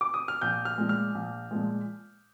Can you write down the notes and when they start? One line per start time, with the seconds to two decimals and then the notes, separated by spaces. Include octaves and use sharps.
0.01 D6
0.14 D#6
0.28 F6
0.41 A#1 G6
0.65 F6
0.78 A#2 F3 G#3
0.89 F6
1.15 A#1
1.51 A#2 F3 G#3